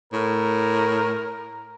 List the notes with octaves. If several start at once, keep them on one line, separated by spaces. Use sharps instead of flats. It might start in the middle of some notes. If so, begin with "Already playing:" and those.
A2 A#4